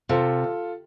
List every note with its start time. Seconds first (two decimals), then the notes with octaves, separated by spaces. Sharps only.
0.09 C3 F4 A4